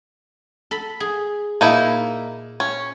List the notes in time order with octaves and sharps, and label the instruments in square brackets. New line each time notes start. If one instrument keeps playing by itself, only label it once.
[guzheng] A4 B5
G#4
[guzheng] A#2 [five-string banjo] A#3 D#4 E4
[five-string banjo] C#4